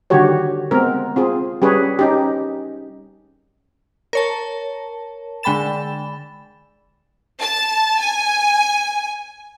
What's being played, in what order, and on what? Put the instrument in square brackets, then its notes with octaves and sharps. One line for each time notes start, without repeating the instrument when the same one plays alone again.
[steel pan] D3 D#3 G3 F#4 G4 C#5
G#3 B3 C4 A#4
C4 F4 G#4
G3 C#4 G4 G#4 B4 C#5
C#4 D#4 G4
[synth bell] A#4 C#5 A5
D3 G#3 G5 B5 A6 E7
[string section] A5
G#5